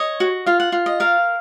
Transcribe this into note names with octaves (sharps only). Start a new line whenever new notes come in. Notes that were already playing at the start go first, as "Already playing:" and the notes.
Already playing: C#5 D#5
F#4
F4 F5
F#5
F4
D#5
A#4 F5